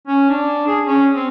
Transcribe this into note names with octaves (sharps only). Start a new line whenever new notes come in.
C#4
D4
G#4
C#4
C4